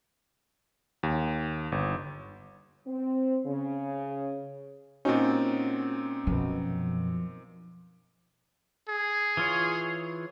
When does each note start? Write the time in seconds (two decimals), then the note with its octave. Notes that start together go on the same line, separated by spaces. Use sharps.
1.03 D#2
1.72 G1
2.87 C4
3.46 C#3
5.05 A#2 C4 C#4 D#4 F#4
6.27 F#2 B2 F3
8.89 G#4
9.37 E3 F4 C#5